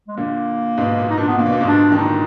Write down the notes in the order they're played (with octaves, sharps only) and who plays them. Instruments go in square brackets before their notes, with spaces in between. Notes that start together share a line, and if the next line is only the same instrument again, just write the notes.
[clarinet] G#3
[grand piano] A#2 D3 [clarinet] A#3
[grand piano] G#2 B2
A#2
[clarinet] D#4
[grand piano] A#2 [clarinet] D4
[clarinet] B3
[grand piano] D3 [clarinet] A#3
[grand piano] B2
A#2
G#2 B2
[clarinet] D4
[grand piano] D#3
[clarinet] D4
[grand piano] A#2 D3 [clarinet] D#4